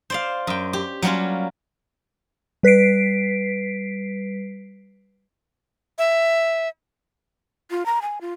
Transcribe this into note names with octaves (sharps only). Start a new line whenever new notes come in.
C5 D5 F5
F#2 G5
G4
F#3 G3 A#3 C#4 F4
G3 B4 B6 C7 D7
E5
F4
A#5
G#5
F4